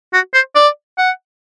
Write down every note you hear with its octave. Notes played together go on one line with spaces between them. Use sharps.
F#4
C5
D5
F#5